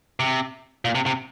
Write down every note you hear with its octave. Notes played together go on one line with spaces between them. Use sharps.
C3
A#2
C3
C3